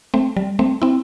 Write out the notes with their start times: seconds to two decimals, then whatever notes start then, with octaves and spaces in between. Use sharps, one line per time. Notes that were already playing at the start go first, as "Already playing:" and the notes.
0.14 A3 C4
0.37 G3
0.59 A3 C4
0.82 C4 E4